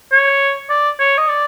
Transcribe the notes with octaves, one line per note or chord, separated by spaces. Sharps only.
C#5
D5
C#5
D#5
D5